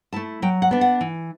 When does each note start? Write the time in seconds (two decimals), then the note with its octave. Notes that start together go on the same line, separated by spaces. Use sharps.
0.13 A3 E4 A5
0.42 F#3 G5
0.62 F#5
0.71 B3 D4
0.81 F#5
1.01 E3